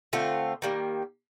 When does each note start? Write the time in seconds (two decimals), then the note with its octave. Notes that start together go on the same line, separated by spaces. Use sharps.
0.13 D3 A3 C4 F4
0.62 D#3 G3 A#3